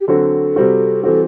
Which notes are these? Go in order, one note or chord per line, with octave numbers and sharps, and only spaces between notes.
G4
D3 F#3 C4 F#4 A4
C3 G3 C4 F#4
E3 G3 C4 F#4 A4